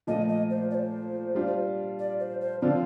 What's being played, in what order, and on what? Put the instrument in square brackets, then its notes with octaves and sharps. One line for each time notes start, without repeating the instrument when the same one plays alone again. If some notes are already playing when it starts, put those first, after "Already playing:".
[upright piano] A#2 F3 A3 [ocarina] D#5
[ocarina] D#5
C5
D5
C5
[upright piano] G3 D4 F4
[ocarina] D5
C5
C5
[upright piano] D3 F3 C4 F4 [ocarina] D5